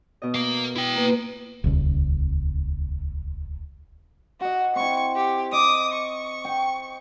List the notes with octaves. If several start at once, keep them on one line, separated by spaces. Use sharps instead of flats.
B2 D#5
A#4 F5
E4 G5
A#3 B4
D#1 C#2
F#4 D#5 F#5
C4 E4 C#6
G4
D#5 D6 D#6
C#6
G5